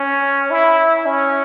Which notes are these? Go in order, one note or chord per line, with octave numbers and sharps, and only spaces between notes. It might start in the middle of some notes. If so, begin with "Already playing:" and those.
Already playing: C#4
E4
C#4